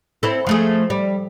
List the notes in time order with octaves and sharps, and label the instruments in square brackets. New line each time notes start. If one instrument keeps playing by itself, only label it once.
[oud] C4 E4 A4
F3 A3 G#4
G3